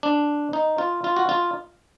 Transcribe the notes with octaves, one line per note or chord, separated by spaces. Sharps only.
D4
D#4
F4
F4
F#4
F4